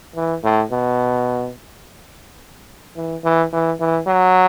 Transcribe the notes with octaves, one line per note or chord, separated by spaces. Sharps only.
E3
A2
B2
E3
E3
E3
E3
F#3